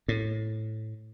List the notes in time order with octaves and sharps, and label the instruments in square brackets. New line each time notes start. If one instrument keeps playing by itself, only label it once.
[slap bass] A2